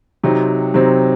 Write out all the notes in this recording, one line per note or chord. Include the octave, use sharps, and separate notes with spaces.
C3 F#3 C4 D#4
C3 F#3 C4 D#4